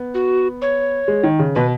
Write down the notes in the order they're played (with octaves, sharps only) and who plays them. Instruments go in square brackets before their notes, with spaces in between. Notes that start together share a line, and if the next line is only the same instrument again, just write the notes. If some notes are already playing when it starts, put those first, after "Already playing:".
Already playing: [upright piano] B3
[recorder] F#4
C#5
[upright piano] G#3
D#3
C#3
[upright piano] B2 [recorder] B4